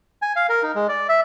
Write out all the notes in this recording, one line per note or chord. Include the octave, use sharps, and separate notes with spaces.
G#5
F5
A#4
D#4
G#3
D5
E5